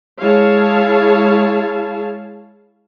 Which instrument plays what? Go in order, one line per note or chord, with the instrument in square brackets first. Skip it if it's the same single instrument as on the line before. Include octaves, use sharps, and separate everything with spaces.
[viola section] G#3 E4 G#4 C#5 F5 A5